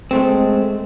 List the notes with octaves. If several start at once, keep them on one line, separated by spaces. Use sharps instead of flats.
G#3 A3 C4